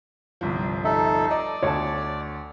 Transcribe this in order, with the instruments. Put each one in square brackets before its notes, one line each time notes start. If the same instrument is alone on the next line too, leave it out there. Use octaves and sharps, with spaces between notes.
[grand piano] G1 C2 F3
[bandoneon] D#4 A4 [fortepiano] E5
[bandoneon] D5 [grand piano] D#5
[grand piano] D2 [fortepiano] C#5 A5